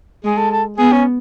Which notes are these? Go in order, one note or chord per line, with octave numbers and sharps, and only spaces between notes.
G#3 G#4
A4
A4
B3 G#4
C#4